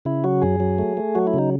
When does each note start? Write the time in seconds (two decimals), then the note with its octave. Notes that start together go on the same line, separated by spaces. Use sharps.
0.05 C#3 E4
0.24 F#3 F#4
0.42 F#2 G#4
0.60 F#3
0.78 A3
0.97 A3
1.15 F#3 F#4
1.27 E4
1.34 C#3 D#4